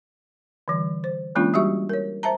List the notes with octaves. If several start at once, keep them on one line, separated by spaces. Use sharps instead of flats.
D3 E3 G3
C5
E3 G#3 A#3 C#4 D4 F4
G3 F#4 G4 E5 C#6
A#4 C#5
C5 E5 A5 A#5